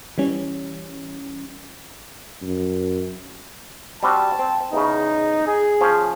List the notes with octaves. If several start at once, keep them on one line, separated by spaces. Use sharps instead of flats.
E3 G3 C#4
F#2
G3 C4 F#4 A5
C4
E2 C#3 D#4
G#4
F3 C#4